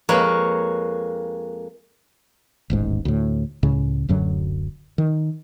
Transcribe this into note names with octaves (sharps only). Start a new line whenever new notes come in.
F2 G#3 A#3 B4 C#5 B5
D#1 A1 G#2
D2 A2
C#2 A2 C#3
D1 F#2 D3 F#3
D#3